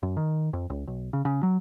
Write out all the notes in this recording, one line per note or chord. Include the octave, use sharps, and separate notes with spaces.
F#2
D#3
F2
C#2
B1
C#3
C#3
F#3